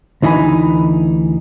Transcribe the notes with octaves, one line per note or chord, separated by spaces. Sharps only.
D2 E3 D#4 G#5 B5